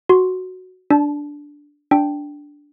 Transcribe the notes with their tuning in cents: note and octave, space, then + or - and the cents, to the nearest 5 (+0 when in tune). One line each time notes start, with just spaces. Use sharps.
F#4 +0 C6 +0
D4 -5 A5 -30
D4 -5 G5 +0